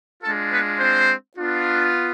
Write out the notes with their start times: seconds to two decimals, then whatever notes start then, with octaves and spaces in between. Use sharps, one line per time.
0.23 G#3 D4 F4 A4
0.52 B3 B4
0.80 C4 C5
1.37 B3 D4 F4